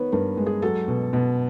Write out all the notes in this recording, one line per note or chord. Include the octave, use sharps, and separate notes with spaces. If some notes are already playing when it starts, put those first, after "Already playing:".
Already playing: D#3 B3 B4 C#5
G2 A#4
G#3
G#4
F#3 A4
B2
B2